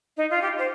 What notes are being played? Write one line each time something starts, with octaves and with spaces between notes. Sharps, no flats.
D#4
F4
G4
C5